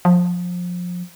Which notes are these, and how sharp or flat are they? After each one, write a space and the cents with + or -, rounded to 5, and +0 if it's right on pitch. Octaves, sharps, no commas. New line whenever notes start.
F3 +25